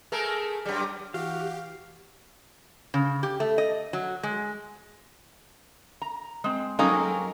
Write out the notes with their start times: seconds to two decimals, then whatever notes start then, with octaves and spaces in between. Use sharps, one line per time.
0.12 A3 G#4 A#4
0.66 F#2 G3
1.14 E3 E4 F#4 G4 F5
2.94 C#3
3.23 G4
3.40 A3
3.58 D#5
3.93 F#3
4.23 G#3
6.02 A#5
6.44 G#3 C4
6.79 F#3 G#3 A#3 C4 C#4 D#4 A4 A#4